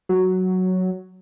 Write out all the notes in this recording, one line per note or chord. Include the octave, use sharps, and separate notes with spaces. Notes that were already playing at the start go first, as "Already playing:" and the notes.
F#3